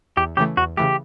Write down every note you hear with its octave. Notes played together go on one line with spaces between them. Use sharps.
E2 G4
C#3 E3 A3 G4
E2 F#4
C#3 E3 A3 G4